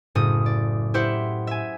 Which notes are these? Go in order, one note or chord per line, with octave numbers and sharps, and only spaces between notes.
F#1 A2 D#6
D5
E4 G4 C5 E5 F#5
E5 G#5